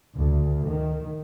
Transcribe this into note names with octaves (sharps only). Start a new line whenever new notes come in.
D2
D#3